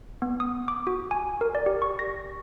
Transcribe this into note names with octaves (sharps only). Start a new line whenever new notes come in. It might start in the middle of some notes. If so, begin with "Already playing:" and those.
B3
D#6
D6
F#4
G#5
A#4
D5
G4
C#6
A#6